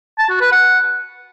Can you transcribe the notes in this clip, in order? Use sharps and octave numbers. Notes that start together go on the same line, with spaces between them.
A5
F#4
B4
F#5